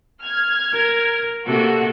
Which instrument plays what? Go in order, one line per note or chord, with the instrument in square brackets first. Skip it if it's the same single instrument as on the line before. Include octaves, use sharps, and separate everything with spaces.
[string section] F6 G#6
[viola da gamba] A#4
[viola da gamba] C3 A#3 A4 [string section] F#4